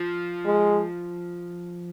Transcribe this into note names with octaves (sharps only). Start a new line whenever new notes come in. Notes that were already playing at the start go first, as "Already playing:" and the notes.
Already playing: F3
G#3